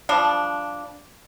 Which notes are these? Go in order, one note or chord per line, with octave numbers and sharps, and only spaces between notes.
F3 G3 D4